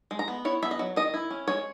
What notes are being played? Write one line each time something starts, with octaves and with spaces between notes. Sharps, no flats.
G#3
A#5
B3
E4 C#5
B3 E5
D#5
F#3
D#3 D#5
E4
C#4
G#3 C#5